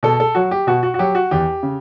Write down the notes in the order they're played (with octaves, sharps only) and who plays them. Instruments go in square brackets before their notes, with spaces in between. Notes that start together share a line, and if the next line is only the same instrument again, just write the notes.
[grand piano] B2 A4
A4
F#3 F#4
G4
B2 F#4
F#4
F#4
F#3 G4
F#4
E2 G4
C#3